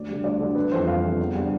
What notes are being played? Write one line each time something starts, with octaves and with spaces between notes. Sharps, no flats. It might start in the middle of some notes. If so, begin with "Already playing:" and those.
Already playing: D2 D5
D3 G3
D2 D5
D3 G3
G1 B4
F2 E3 C5
G1 F5
F2 E3
E2
D3 G3